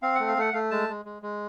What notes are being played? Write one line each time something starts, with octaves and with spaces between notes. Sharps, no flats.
C4 F5
A3 F#5
F5
A3 F#5
A3 F5
G#3 A5
G#3
G#3
G#3